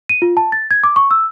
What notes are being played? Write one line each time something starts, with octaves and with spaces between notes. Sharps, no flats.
D#7
F4
A5
A6
G#6
D6
C#6
E6